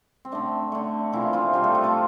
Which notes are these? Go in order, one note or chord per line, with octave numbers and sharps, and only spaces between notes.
C4
D3 A3 D4
D3 A3
C3 E3 F3 A#3 E4
F3 F4
C3 F3 G3 A#3 G4
A3 A4
F3 F4
A3 A4